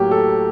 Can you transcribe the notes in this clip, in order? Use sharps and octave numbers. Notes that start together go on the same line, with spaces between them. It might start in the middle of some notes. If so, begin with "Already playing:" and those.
Already playing: A2 F#3 A#3 G4
A4